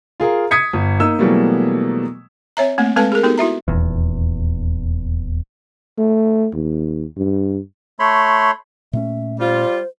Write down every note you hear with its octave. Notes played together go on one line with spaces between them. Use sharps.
F4 G#4 A#4
D#6 G#6 B6 C#7
G1
A#3 D#4 E6
B2 E3 F#3 G3 A3 A#3
C4 C#5 E5 A#5
A3 A#3 C4
G#3 C4 A4 B4 A5
G#4 A#4
B3 D#4 F#4 G4 A4 A#4
E4 F#4 E5 A#5
D#1 E2
A3
D#2
G2
A3 C#5 B5 C6
A#2 A3 C#4 E5
G3 F4 C5